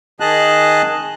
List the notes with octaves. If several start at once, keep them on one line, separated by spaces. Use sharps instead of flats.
D#3 G#4 D#5 A5 F#6